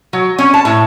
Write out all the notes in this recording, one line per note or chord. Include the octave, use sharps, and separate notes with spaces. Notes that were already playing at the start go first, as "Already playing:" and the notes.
F#3
C#4
A5
A2